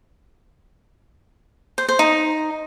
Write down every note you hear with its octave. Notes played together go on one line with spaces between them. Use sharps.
C5
C5
D#4